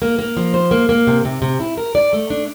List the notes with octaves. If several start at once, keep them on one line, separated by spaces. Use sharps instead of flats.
A#3
A#3
F3
C5
A#3
A#3
C3
C3
C3
E4
A#4
D5
A3
D4